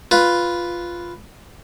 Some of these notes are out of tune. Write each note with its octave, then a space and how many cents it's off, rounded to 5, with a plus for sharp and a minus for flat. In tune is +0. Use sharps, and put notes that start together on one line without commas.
F4 +0 B4 +0